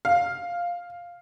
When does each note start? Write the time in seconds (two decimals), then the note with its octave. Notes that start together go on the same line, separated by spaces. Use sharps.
0.05 F5